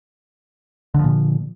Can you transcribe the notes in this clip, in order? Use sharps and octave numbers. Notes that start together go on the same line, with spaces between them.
A#2 D3 F3